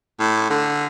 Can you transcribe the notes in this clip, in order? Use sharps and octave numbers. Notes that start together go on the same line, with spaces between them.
A2
D3